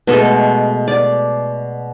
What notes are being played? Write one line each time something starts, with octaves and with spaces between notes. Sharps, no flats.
B2 G#3 A3 A4
D5